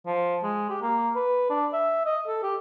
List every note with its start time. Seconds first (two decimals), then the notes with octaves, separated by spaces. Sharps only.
0.06 F3
0.43 G#3
0.70 G4
0.82 A#3
1.16 B4
1.50 D4
1.73 E5
2.06 D#5
2.27 A4
2.43 G4